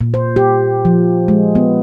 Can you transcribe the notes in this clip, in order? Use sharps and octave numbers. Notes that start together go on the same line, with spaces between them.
A#2
C5
G4
F3
G#3
B3